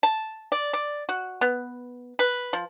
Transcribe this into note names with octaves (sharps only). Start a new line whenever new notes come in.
A5
D5
D5
F#4
B3
B4
F3